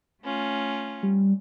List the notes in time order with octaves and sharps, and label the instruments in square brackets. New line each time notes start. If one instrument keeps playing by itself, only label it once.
[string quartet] A3 C#4 F4
[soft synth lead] G3